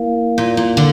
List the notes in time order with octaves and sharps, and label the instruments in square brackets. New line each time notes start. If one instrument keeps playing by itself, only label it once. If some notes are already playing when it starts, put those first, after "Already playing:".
Already playing: [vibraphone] A#3 E4 A#4 F5
[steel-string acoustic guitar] A#2
A#2
D3